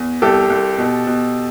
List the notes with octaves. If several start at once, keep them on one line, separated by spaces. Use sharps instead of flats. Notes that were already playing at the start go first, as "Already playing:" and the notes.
Already playing: E2
C2 G4 A4
C2
B2
B2